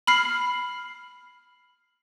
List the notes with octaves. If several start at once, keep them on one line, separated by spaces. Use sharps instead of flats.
B5 F6 C7